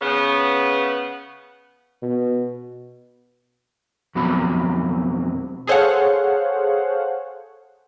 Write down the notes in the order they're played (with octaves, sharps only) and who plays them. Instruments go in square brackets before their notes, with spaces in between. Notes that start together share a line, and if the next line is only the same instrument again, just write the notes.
[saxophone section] C#3 B3
[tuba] B2
[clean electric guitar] F2 B2 F#3 C4 B5
[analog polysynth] G#4 A4 C5 C#5 F5 F#5